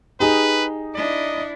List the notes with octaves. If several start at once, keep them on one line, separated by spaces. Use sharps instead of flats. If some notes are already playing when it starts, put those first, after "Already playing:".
D#4 G4 G#4 B4
D4 E4 D#5